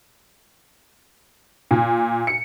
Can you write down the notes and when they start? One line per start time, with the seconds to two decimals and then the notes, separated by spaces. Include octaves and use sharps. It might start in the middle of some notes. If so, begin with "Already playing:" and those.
1.71 A#2
2.27 C#7